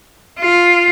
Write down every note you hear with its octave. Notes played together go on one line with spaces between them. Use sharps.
F4